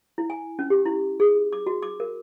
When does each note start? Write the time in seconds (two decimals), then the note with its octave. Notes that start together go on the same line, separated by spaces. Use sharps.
0.18 E4
0.30 G#5
0.59 C#4
0.70 G4
0.86 E4
1.20 G#4
1.53 D6
1.67 F#4
1.82 D6
2.00 A#4